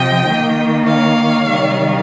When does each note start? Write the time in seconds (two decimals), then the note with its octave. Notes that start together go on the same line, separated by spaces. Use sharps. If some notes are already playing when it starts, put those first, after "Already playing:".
Already playing: C3 F3 D#5 G5
0.26 D#3 A#3
0.87 C#5 F5
1.48 C3 D#3 G3